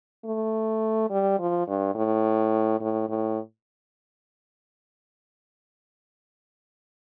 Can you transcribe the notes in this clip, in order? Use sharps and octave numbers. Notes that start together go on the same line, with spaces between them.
A3
G3
F3
G2
A2
A2
A2